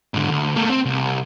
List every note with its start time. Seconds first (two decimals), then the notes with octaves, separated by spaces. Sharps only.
0.14 G#2 D3
0.29 D2
0.55 A3 A#3
0.70 C4
0.85 C2